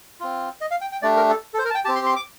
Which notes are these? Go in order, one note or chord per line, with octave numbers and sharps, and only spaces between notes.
C4 F4
D#5
F5
G5
G5
A3 D4 G4 D5
A#4
A4
A4
C5
A#4
A5
G5
C4 G4 A5
C6
C6
D6